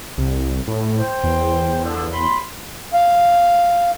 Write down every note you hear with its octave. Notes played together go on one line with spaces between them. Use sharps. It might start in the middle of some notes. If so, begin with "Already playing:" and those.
C2
A2
C5 G5
E2
D3 F3
F#2 B5 C6
F5